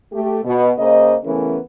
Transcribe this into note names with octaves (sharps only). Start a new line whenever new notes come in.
A3 G4
B2
C#3 A#3 C5 D#5
C#3 E3 A3 B3 C#4 A#4